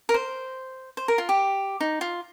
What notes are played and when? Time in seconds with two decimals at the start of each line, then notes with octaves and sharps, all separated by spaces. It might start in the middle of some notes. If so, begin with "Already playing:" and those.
0.09 A#4
0.14 C5
0.97 C5
1.08 A#4
1.18 F4
1.29 G4
1.80 D#4
2.01 F4